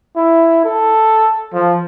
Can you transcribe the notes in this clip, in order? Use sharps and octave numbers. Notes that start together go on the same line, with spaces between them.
E4
A4
F3